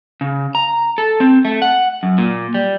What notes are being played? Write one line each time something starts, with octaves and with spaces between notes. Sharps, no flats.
C#3
A#5
A4
C4
A3
F#5
F#2
A#2
G3